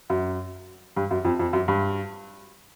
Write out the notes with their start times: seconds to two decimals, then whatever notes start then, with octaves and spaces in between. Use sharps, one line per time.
0.10 F#2
0.96 G2
1.11 F#2
1.25 F2
1.39 F2
1.53 F#2
1.68 G2